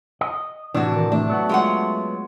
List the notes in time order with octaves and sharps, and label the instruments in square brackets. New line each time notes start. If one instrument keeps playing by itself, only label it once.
[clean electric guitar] D#5
[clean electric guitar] A2 C3 E3 [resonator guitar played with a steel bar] D4 F#4
[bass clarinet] D#3
[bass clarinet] A3 [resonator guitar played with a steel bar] D4
[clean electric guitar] F#3 B3 F#4
[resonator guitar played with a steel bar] G#3 F4 F#5